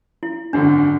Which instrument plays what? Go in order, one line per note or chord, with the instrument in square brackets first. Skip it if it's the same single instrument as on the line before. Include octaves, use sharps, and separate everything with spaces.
[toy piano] E4
[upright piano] G#1 F#2 D3 [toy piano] D4